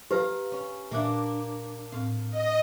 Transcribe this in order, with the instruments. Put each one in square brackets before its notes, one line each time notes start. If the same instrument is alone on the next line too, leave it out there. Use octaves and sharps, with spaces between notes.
[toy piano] G4 B4 [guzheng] F5 A#5
[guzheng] C#4
[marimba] A#2 E5 F#6 [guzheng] A#3 D4
[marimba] A2 C4 [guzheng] F5
[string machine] D#5